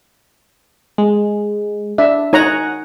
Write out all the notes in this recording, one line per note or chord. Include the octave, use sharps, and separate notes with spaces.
G#3
D4 E5
D#4 C#5 F#5 G#5 A#5